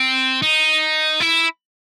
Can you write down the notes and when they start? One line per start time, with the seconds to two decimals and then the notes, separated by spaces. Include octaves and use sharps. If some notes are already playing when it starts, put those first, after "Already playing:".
Already playing: C4
0.42 D#4
1.20 E4